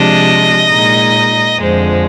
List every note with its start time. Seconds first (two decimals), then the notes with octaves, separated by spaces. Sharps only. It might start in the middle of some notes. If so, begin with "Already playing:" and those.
Already playing: C3 F3 G#3 D4 D#5
0.69 A#2 G#3 D#4
1.58 F2 D3 F3 G#3 C5